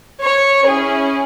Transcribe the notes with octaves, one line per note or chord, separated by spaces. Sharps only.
C#5
C#4 E4 G#4